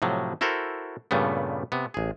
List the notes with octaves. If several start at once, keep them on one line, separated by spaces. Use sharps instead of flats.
A2 C3 F3 F#3
E4 F#4 A4 A#4 C5
G2 A#2 C#3 G3 A3 B3
C3 B3
A1 G#4